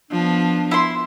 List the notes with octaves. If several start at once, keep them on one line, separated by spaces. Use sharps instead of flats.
F3 B3 D4
E4 C6